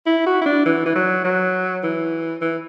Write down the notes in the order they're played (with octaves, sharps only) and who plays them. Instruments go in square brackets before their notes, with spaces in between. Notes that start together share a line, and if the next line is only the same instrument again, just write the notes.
[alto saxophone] E4
F#4
E4
D4
E3
E3
F#3
F#3
E3
E3